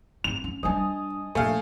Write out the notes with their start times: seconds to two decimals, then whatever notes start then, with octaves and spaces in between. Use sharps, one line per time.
0.24 D#3 C4 F7
0.44 C#4
0.63 G3 D4 D#5 G#5 A5
1.35 A#1 A3 F5 G#5